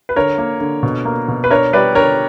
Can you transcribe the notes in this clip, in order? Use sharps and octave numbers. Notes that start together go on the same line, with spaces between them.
B4
D3 A#4 C#5
A#3
D3
B2
A#3
B2
B4
D4 A#4 C#5
G3 B4 D5
D3 A#4 C#5